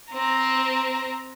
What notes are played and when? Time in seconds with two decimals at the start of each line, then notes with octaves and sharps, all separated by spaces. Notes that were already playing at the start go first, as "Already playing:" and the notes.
0.11 C4 A#5